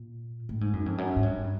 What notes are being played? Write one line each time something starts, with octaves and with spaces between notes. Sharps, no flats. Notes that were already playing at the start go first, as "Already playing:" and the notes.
Already playing: A#2
A2
G#2
F#2
F2
F#2
G#2
G2